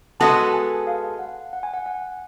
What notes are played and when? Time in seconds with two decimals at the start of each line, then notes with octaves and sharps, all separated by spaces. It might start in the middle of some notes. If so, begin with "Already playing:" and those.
0.20 G#3 B3 F#4 A4 A5
0.49 A5
0.53 G#5
0.87 F5
1.19 F#5
1.53 F#5
1.63 G#5
1.74 F#5
1.86 F#5